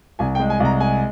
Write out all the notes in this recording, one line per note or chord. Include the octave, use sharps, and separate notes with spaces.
C2 G#5
G5
G#3
G#5
C2 A#5
G#3 G#5